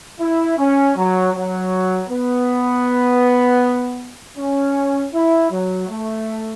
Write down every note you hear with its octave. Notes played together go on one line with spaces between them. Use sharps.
E4
C#4
F#3
F#3
B3
C#4
E4
F#3
A3